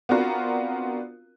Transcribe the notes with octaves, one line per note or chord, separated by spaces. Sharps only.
B3 C4 D4 F4 F#4 A#4